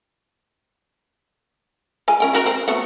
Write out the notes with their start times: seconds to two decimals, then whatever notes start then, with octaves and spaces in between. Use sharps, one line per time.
2.08 G#3 F4 G#5
2.20 C#4 A#4 G5
2.33 G#3 F#4 A#4
2.46 C4
2.68 A3 B3 F#4